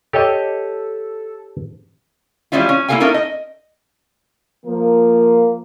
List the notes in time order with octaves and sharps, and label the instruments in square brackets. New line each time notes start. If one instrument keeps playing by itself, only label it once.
[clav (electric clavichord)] G4 C#5 D#5 [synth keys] A4
[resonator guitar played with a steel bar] E3 G3 G#3 C#4 E4 F4
C#4
A#3 E4 G#4 A4 F5 G#5
C#4 D#4 E4 A4 A#4
D#5
[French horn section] F3 A#3